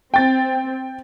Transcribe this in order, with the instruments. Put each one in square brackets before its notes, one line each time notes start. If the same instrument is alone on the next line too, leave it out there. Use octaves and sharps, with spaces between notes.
[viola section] C4 [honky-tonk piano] G5 A6